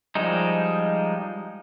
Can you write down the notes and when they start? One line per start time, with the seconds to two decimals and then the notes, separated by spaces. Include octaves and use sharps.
0.15 F3 G3 G#3 D#4